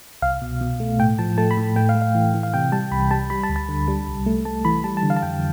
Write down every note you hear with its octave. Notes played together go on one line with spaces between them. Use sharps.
C2 F5
B2
B2
A3
A2 G5
F3 A5
A3 A5
B5
A2
A5
A3 G5
F5
A3
F5
E3
E3
F5
C3 G5
G3 A5
C2 B5
G3 A5
G3 B5
A5
D2
A5
D3
G3
C2
A3
A3 A5
E3 B5
G3 A5
A5
D3
F5
A5
F2 G5